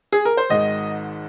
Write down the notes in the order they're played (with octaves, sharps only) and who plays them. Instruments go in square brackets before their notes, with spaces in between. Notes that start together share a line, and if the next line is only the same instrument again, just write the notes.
[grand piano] G#4
A#4
C5
G#1 G#2 D#3 G#3 D#5